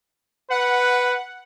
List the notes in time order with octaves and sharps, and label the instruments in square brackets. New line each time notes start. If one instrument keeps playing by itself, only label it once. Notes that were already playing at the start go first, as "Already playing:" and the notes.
[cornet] B4 [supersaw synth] F#5